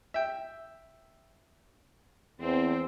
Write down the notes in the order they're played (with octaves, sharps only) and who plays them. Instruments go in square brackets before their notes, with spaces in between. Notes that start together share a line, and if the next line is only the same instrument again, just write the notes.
[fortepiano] E5 G5
[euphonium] E2 [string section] C4